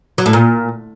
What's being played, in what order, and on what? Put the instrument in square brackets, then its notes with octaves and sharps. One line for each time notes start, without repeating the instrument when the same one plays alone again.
[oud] F#3
A2
A#2